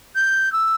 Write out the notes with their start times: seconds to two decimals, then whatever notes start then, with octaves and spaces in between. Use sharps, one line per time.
0.16 G6
0.52 E6